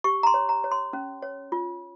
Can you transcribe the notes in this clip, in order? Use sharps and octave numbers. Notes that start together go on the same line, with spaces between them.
G4 C#6
A#5
C6
C#5
A#5
C#5
C6
C#4
C#5
F4